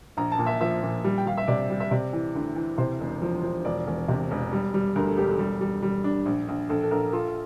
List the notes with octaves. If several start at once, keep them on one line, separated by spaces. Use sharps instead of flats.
A#1 A#5
A5
A#2
E5
F3 E5
A#2
G3
G5
G3 F5
E5
C3 D5
G3
E5
C3 D5
E3
D2
E3
C3 C5
E1
F3
F3
E1 D5
E1
C3
E1
G3
G3
D2 A#4
A4
E1 G4
A4
G3
G3
G3
D4
A#1
A#1
A#1 A4
A4
A#1 A#4
F4 A4